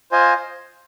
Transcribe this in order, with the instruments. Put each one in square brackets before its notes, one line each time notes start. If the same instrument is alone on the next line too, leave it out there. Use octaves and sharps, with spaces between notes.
[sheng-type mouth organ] F4 C5 D#5 G#5